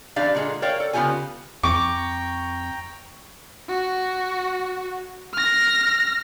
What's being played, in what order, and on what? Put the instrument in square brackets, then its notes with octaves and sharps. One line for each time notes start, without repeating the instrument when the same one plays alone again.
[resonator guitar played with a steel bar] E2 D4 G4 D5 F5
A#2 D3 G#3
A#4 C#5 D5 F5 G5
A4
C#3 B3 D4 F4 G4 G#5
[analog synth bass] F2 [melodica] G5 A#5 [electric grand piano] C#6 [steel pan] D6
[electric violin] F#4
F6 A#6